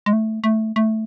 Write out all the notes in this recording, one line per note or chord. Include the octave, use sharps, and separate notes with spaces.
G#3
A3
A3
A3